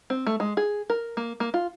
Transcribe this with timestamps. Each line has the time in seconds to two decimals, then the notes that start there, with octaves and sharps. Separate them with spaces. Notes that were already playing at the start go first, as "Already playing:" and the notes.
0.10 C4
0.27 A3
0.40 G#3
0.57 G#4
0.90 A#4
1.17 A#3
1.40 A#3
1.54 F4